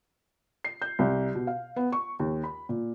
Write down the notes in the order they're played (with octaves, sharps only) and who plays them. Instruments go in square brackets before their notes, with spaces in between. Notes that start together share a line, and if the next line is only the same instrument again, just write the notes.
[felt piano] C7
G6
C2
B2
F5
B3
C#6
D#2
B5
A#2